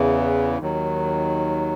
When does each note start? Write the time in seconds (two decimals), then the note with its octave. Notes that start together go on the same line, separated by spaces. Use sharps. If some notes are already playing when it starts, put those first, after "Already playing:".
Already playing: E2 C#3 E3
0.59 D#2 D#3 F#3